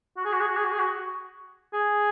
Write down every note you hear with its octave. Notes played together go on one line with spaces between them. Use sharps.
F#4
G#4
F#4
G#4
F#4
G#4
F#4
G#4
F#4
G#4